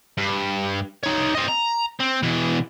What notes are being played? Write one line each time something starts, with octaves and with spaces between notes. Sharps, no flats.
G2
D#4 C#5
C4 D#5
A#5
C4
B2 E3